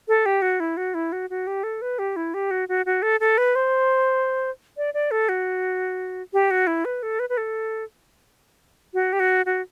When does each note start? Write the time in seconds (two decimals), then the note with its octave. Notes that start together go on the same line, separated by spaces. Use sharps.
0.08 A4
0.26 G4
0.42 F#4
0.60 E4
0.77 F#4
0.94 E4
1.12 F#4
1.30 F#4
1.47 G4
1.63 A4
1.82 B4
1.99 G4
2.16 E4
2.34 G4
2.51 F#4
2.69 F#4
2.86 F#4
3.02 A4
3.20 A4
3.38 B4
3.55 C5
4.77 D5
4.94 D5
5.11 A4
5.29 F#4
6.33 G4
6.51 F#4
6.67 E4
6.85 B4
7.03 A4
7.19 B4
7.29 B4
7.37 A4
8.94 F#4
9.13 G4
9.20 F#4
9.46 F#4